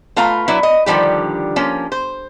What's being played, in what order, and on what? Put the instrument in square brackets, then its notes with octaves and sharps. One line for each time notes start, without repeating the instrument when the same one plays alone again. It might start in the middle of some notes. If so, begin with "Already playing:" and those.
[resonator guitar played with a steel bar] A3 F4 B4 F5 A#5
F#3 D4 E4 B4
D#5
D3 D#3 F3 G3 G4
F3 A#3 C#4
C5